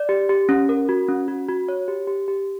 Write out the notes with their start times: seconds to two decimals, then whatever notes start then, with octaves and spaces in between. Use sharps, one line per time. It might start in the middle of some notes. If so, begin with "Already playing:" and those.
Already playing: D5
0.09 G4
0.29 G4
0.49 C#4
0.69 A#4
0.89 F#4
1.08 C#4
1.28 F#4
1.49 F#4
1.69 C#5
1.88 G4
2.07 G4
2.28 G4